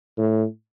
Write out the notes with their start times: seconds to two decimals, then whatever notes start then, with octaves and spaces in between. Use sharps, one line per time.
0.18 A2